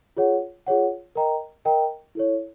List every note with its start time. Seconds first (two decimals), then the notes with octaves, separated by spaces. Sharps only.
0.17 F4 G#4 C#5 F#5
0.66 F4 G#4 C#5 F#5
1.15 A#4 D#5 G5 A#5
1.65 A#4 D#5 G5 A#5
2.15 E4 A4 C#5